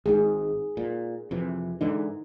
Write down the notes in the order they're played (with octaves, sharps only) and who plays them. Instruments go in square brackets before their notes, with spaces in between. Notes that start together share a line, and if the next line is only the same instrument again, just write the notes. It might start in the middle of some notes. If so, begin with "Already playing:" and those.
[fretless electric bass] G#1 G#2 [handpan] D#4 G#4
[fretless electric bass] A#2
F2 C3 E3
[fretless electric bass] G#2 D3 E3 [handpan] D#4